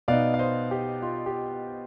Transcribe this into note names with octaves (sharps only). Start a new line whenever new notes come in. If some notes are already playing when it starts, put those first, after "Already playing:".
B2 B3 D#4 D5 F5
F5
C5 D#5
G4
F4
G4